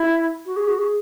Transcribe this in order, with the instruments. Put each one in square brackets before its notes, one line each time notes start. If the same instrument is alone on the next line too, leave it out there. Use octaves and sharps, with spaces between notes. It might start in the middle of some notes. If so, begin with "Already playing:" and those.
Already playing: [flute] E4
F#4
G#4
F#4
G#4